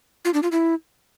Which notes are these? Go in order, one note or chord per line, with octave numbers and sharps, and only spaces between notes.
F4
D4
F4
E4